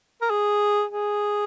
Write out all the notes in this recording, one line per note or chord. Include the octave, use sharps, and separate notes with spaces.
A#4
G#4
G#4